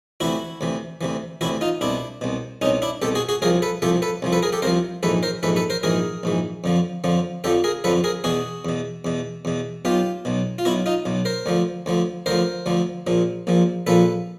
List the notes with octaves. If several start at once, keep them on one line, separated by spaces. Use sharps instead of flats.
D2 C3 E3 E4 F#4
D2 C3 E3
D2 C3 E3
D2 C3 E3 E4 F#4
D#4 F4
C2 B2 D4 E4
C2 B2
C2 B2 C#4 D#4
D4 E4
C2 B2 G4 A4
F#4 G#4
F#4 G#4
C2 C3 F3 G#4 A#4
A4 B4
C2 C3 F3 G4 A4
A4 B4
C2 C3 F3
A4 B4
G#4 A#4
G4 A4
C2 C3 F3 A#4 C5
A#1 G#2 E3 A4 B4
A#4 C5
A#1 G#2 E3 A4 B4
A4 B4
A#4 C5
A#1 G#2 E3 G#4 A#4
A#1 G#2 E3
F2 D3 F3
F2 D3 F3
F2 D3 F3 G4 A4
G#4 A#4
F2 D3 F3 A4 B4
G#4 A#4
E2 B2 F#4 G#4
E2 B2
E2 B2
E2 B2
B1 B2 F4 G4
B1 B2
F4
B1 B2 E4 F#4
D#4 F4
B1 B2
A#4 C5
D2 D3 F3
D2 D3 F3
D2 D3 F3 A#4 C5
D2 D3 F3
A#1 A#2 F3
A#1 A#2 F3
A#1 A#2 F3 A4 B4